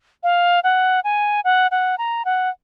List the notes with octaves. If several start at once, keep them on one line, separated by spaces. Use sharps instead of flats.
F5
F#5
G#5
F#5
F#5
A#5
F#5